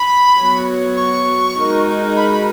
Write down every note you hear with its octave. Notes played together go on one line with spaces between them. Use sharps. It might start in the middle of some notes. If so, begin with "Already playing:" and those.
Already playing: B5
F#3 B3 F#4 C#5
C#6
G#3 D#4 F#4 A#4
B5
B5